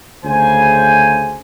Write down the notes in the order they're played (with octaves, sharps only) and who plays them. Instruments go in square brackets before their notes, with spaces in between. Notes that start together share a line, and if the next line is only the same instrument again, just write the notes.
[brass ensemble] D2 C#3 C5 G#5